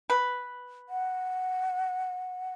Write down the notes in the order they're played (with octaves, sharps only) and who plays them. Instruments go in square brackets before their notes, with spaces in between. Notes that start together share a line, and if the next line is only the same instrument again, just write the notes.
[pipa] B4
[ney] F#5